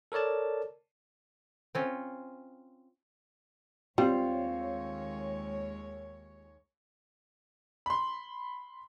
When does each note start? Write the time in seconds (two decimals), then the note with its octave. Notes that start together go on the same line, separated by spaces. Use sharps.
0.12 A4 A#4 C#5 D5 A5
1.75 C4 C#4 F4
3.98 D#2 G3 G#3 C4 F4 C#5
7.86 B5 C6